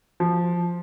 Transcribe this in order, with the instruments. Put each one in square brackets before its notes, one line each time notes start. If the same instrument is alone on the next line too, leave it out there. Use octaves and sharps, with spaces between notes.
[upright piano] F3